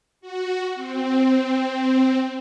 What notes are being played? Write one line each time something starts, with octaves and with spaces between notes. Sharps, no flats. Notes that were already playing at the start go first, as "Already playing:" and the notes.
F#4
C4